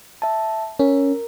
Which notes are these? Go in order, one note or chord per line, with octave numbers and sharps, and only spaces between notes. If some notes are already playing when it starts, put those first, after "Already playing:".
E5 A5
C#4 A#4